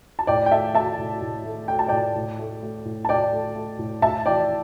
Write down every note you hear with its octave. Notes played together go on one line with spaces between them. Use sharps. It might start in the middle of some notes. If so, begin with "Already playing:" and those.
A5
A2 D5 G5
G5
A3 E5 A5
A3 E5 A5
A2
A2
A3
A3 G5
A5
A2 D5 G5
A2
A3
A3
A2
A5
A2 D5 G5
A3
A3
A2
A2 E5 A5
E3 D5 G5